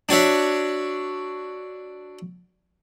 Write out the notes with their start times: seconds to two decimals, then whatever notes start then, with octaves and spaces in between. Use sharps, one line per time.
0.09 D4 F#4 C#5 E5